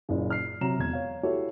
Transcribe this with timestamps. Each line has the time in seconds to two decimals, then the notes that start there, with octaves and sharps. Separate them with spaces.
0.09 F#1 A#2 C#3
0.30 F6 C7
0.61 C3 F#3 A#5 E7
0.78 E1 G#6
0.93 C#5 F5
1.23 E4 F#4 G4 A4 C#5